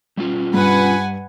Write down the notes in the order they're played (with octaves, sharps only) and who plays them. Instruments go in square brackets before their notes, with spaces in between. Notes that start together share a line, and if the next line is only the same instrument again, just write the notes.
[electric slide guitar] G3 C#4 F4
[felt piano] G2 [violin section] B4 F#5 G#5